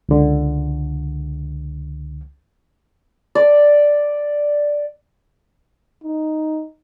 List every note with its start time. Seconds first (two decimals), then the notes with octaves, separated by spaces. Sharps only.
0.09 C#2 D3
3.35 D5
6.04 D#4